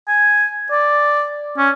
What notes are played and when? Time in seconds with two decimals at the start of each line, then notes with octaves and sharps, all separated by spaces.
0.09 G#5
0.72 D5
1.58 C#4